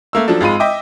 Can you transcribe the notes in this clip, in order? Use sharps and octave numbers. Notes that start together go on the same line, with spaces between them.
A3 A#3 E6
F3 F#3 D4 A4
G#1 G#3 F4 B5 D#7
D#5 E5 G5 D6